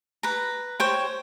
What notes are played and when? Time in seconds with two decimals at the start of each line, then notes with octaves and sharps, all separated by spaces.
0.23 B4 A#5
0.80 C5 C#5 G5